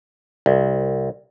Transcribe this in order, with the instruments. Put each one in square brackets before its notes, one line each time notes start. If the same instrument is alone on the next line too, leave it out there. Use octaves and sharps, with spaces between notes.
[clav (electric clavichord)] C2